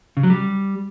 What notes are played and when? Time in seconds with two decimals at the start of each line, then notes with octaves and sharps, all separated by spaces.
0.17 C#3
0.23 F#3
0.30 G3